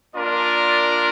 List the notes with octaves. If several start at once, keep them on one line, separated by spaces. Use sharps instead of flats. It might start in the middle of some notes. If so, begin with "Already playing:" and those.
A#3 D4 F4 A#4 D5